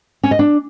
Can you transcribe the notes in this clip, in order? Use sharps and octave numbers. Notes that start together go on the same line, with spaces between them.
C#4
D#5
D4